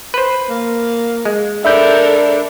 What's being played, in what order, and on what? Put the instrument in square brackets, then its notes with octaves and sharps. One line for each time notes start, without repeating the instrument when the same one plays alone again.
[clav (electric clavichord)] B4 C5
[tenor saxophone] A#3
[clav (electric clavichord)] G#3
[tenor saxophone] D4 [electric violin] A4 A#4 [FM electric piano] E5 B5 G6